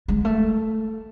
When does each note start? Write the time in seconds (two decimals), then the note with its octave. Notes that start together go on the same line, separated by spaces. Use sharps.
0.08 G#3
0.25 A3